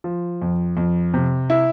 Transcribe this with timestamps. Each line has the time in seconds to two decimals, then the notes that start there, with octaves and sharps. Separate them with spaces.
0.04 F3
0.42 F2
0.77 F2
1.14 C3
1.50 E4